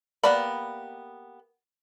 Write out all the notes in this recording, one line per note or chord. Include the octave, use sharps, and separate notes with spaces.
A#3 B3 G4 D5 B5